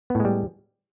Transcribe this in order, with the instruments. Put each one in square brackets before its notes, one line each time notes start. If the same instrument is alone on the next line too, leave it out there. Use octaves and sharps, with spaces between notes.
[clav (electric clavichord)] B3
A2
G#3
G3